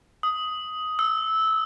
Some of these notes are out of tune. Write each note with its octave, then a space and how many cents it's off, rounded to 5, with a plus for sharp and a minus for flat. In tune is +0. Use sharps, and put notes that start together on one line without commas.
D#6 +10
E6 -15